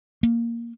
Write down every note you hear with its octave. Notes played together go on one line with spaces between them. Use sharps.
A#3